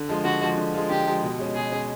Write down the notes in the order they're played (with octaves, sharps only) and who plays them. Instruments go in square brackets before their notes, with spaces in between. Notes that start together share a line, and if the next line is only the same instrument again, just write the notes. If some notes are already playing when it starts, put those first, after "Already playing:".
Already playing: [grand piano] D3
F3 G#3
[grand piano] D3 [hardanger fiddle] F#4
[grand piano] F3 G#3
D3
F3 G#3
[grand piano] D3 [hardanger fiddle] G4
[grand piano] F3 G#3
B2
G#3 C#4
[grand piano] B2 [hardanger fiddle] G#4
[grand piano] G#3 C#4